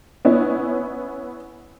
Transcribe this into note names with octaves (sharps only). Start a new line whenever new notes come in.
B3 C#4 E4